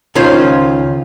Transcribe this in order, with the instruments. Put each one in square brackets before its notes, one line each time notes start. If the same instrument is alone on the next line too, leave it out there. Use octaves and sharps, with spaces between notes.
[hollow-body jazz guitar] C#2 D#3 C#4 F4 C5